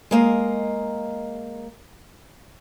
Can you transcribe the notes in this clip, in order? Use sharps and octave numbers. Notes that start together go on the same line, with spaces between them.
G#3 A#3 D#5